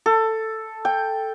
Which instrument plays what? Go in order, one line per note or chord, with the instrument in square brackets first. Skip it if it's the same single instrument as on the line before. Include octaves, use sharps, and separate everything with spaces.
[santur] A4
G5